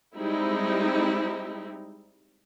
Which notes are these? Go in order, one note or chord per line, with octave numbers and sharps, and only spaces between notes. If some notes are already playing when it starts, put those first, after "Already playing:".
G3 G#3 C4 D#4 E4